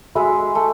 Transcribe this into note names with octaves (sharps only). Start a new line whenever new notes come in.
G#3 F#4 A4 E5 B5
A3